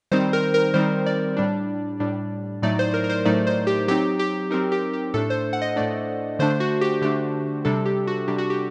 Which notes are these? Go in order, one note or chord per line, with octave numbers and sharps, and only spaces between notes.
D#3 G3 C4 D#4 C5
A#4
A#4
D#3 G3 C4 D#4 C5
D5
A2 G3 D4
A2 G3 D4
A2 F#3 A3 D#4 D5
C5
A#4
A#4
C5
A2 F#3 A3 D#4 D5
C5
G4
F#3 C4 D#4 G4
G4
F#3 C4 D#4 A#4
G4
G4
A2 A3 D4 A4
C5
F#5
D#5
A2 A3 D4 D5
D3 A3 D4 C5
F#4
G4
D3 A3 D4 G4
C3 G3 D4 A4
G4
F#4
C3 G3 D4 G4
F#4
G4